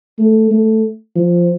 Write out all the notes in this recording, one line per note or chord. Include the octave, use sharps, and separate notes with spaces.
A3
A3
F3